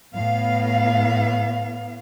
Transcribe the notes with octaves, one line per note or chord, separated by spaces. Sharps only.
A2 B3 F5